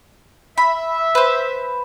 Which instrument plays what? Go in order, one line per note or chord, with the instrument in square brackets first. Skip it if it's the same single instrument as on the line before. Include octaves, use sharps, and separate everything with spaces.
[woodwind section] E5 [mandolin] B5
[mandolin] B4 C5